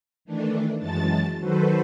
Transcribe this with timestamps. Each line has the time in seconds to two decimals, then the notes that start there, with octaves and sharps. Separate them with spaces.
0.25 D#3 E3 A3 D4
0.79 F#2 E3 F#3 G#3 A5 A6
1.40 D#3 F#3 F#4 A4 B4 C5